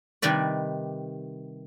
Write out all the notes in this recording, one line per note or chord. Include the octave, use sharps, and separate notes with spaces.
C3 D#3 G3 B4 D5